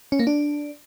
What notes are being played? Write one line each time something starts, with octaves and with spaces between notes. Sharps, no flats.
C#4
A#3
D4